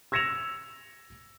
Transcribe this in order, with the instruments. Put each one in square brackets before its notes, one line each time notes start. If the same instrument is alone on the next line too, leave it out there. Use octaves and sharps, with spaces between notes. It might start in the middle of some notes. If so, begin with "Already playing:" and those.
[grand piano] E6 G#6 A#6 C#7 E7 F7